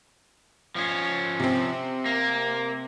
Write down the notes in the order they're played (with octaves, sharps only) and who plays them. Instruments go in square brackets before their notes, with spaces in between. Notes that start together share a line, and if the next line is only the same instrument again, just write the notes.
[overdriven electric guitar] F3 C#4
[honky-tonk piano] C3 C4
[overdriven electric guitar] A#3